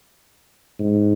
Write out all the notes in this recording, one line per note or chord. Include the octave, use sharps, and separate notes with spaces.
G#2